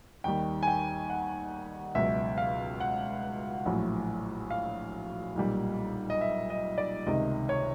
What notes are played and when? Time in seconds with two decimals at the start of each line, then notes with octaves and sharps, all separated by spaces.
0.24 D#2 D#3 G3 G5
0.63 G#5
0.67 G5
1.10 F#5
1.95 C#2 B2 F#3 E5
2.38 F5
2.80 F#5
3.65 A#1 A2 F#3
4.50 F5
5.36 B1 A#2 G3
6.10 D#5
6.21 E5
6.50 D#5
6.78 D5
7.06 C#2 C3 D#3 D#5
7.49 C#5